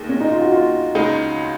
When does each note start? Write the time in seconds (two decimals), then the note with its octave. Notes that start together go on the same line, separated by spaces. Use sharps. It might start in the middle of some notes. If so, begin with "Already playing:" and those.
Already playing: D#2 G#3
0.09 C#4
0.20 D#4
0.31 F4
0.42 F#4
0.52 F4
0.95 C#2 C#3 G#3 D#4